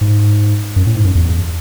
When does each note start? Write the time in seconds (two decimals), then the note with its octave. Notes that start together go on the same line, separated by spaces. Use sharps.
0.01 G#2
0.76 F#2
0.87 A2
0.96 G#2
1.04 F#2
1.15 E2